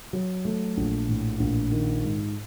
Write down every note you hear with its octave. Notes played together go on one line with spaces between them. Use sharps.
F#3
A3
A#1
A2
A#1
D#3
G#2